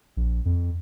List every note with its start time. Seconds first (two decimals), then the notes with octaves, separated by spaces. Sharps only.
0.17 A#1
0.45 F2